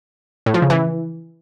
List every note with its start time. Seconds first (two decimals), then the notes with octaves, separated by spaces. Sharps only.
0.46 A2
0.54 F3
0.62 C#3
0.70 E3